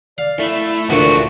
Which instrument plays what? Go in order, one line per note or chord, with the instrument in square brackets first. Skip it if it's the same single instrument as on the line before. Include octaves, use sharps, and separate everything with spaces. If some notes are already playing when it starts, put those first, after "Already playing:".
[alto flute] D5 [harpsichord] F5
[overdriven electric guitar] A3 [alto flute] E4
[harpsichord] D2 A#2 [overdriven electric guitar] E3 A3 [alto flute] D4 [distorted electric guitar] F#4